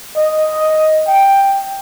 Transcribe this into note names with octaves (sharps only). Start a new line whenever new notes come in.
D#5
G5